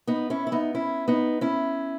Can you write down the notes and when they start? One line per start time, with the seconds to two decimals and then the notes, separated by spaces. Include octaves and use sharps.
0.07 B3 D#4
0.30 C#4 E4
0.47 E4
0.52 B3 D#4
0.74 C#4 E4
1.08 B3 D#4
1.41 C#4 E4